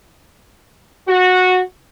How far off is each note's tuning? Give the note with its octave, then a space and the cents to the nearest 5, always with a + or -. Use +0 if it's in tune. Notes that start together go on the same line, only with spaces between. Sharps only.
F#4 -15